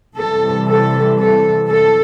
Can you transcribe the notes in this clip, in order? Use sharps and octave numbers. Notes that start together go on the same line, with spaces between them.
C3 E3 G3 A4
A4
A4
A4